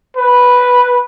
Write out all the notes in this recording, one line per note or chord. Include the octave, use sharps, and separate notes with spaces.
B4